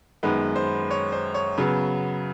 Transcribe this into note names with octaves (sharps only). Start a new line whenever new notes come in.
F#2 D#3 G#3 B3 B4
C5
C#5
C5
C#5
C#3 F#3 B3